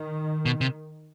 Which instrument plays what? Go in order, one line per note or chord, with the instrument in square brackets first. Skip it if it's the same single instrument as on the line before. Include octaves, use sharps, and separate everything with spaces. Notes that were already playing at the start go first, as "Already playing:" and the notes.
Already playing: [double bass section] D#3
[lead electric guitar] B2
C3